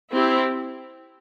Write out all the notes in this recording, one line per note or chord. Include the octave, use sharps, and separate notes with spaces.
C4 E4 G4